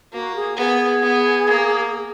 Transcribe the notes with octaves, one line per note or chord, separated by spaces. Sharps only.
A#3 F#4
G#4
B3 G#4
B3
A#3